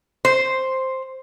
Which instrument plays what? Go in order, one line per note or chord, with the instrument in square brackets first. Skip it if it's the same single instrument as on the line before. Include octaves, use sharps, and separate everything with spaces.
[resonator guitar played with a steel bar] C5